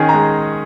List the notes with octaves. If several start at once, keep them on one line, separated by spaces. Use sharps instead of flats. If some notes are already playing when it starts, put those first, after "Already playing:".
Already playing: D#3 C#4 G#4 G#5
A#5
G#3